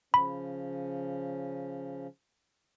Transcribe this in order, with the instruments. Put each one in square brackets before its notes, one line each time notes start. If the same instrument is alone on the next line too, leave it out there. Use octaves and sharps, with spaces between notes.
[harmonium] C#3 F3 C#4 [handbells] B5